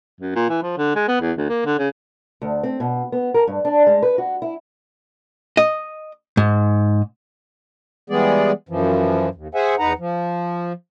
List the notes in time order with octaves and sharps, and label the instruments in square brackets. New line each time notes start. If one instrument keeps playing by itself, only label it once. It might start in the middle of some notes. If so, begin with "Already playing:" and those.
[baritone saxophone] F#2
A#2
E3
F3
D3
G#3
B3
E2
D2
A#3
D3
C#3
[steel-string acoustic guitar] D2
C4
B2
B3
A#4
G2
D4
G#3
B4
F#4
E4
[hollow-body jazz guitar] D#5
G#2
[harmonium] E3 G3 G#3 B3 G#4 D5
F#2 E3 F3
D#2
G#4 C5 E5 F#5 G#5
E2 D#4 B4 F#5 A#5
F3